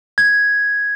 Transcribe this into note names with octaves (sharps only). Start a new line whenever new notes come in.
G#6